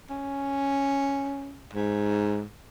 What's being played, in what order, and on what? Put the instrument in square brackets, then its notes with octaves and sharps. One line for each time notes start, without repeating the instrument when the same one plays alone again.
[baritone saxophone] C#4
G#2